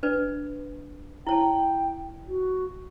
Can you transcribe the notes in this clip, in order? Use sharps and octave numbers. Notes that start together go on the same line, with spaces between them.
D4 B4 D5
E4 C#5 G5 A5
F#4